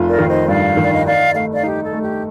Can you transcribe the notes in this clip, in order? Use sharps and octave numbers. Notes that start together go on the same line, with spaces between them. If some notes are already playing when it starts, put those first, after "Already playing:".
Already playing: F1 F4
A#4 D5
D#3 F5
C5 D#5
G2 D5 F5
D#3 D5
D#5
D#4 D5 F5
A3 F5
D5 F5
D#4 G4
A4
A3
G4